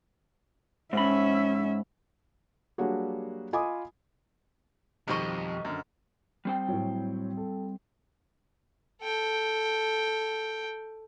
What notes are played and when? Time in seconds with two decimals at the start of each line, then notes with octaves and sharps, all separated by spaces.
0.93 G#2 C#4 E5 B5
2.78 F#3 G3 A#3 D4 F#4 G#4
3.53 F4 D#5 G#5 B5 D6 D#6
5.08 B1 F2 D#3 G3 C5 D#5 C#6
5.65 F#2 D3
6.45 G3 C4 G5
6.69 A2 F#3
7.37 A4
9.02 A4 G5